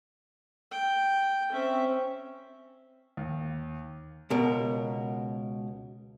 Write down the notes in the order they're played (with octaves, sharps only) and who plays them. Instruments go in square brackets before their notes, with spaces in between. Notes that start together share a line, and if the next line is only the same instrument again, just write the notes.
[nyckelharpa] G5
[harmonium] C4 E5 [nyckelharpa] C#4
[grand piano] D#2
[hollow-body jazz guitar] C#2 B2 A#4